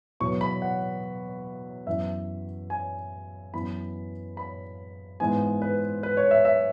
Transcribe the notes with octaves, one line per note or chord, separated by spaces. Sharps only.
E2 B2 F#3 B3 C#6
B5
F#5
F#2 E3 B3 E5
G#5
F#2 E3 B3 B5
B5
G#2 E3 B3 G#5
B4
B4
C#5
E5
E5